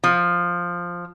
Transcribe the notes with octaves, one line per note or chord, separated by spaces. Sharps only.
F3